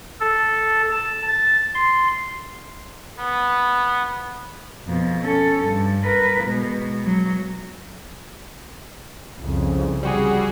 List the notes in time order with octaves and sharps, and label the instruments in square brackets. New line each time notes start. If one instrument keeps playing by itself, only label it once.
[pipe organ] A4
A5
A6
C6
[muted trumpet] B3
[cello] F2 B2
C#4 A4
G2
A#4 B4
B2 G#3
F#3
[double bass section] C2 F2 C#3
[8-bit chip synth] G3 F#4 G#4